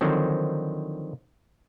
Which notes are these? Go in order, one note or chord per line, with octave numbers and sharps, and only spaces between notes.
D3 D#3 F3 F#3 C4